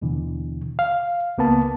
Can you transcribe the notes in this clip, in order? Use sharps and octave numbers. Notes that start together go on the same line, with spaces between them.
D#2 B2 D3 E3
F5
C#2 A#3 B3 A5